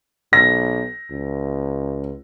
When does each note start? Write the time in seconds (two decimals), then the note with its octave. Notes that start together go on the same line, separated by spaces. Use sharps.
0.33 B1 A#6
1.11 C#2